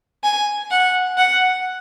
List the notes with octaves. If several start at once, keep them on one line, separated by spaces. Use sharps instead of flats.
G#5
F#5
F#5